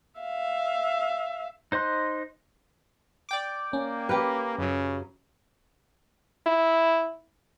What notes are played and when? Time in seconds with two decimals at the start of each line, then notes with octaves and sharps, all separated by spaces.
0.19 E5 F5
1.72 D#4 C5 D#5 C6 F#6
3.29 D5 G5 D6
3.73 A#3 C#4
4.09 G4 A#4 B4
4.58 F#2 C#3 F#3
6.46 E4